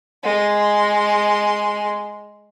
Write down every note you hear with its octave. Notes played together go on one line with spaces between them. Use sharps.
G#3 C6